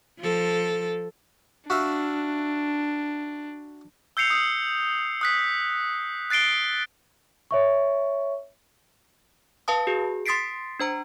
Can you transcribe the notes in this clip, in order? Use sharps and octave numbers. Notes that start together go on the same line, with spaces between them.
F3 A4
D4 F#4 E5 F5
E6 G6 C7 C#7 F7
D#6
D#6 F#6 B6
F#6 A6 C7 D7 G7
C#5 E5 C#6
B4 F5 A5 D#6
F#4 G#4
C6 D#6 A6 B6 C7 D7
D4 C5 A#5